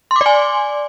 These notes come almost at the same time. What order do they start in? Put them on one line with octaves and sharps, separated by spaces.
C6 D6 D5 G#5